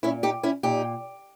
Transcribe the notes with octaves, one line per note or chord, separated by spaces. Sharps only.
A#2 C#4 E4
D#4 G4
C#4 E4
A#2 D#4 G4